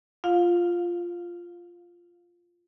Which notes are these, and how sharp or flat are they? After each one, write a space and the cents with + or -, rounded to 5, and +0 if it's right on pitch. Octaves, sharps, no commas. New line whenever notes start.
F4 -5 F5 +25